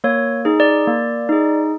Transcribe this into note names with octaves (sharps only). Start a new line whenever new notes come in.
A#3 C#5
D#4 G#4
D5
A#3
D#4 G#4